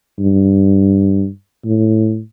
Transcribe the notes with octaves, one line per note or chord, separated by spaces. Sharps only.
G2
A2